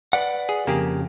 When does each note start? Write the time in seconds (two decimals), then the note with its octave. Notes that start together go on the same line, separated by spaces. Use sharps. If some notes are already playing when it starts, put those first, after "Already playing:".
0.13 B4 D5 F#5
0.49 G#4
0.67 F2 C#3 A#3 G4 G#4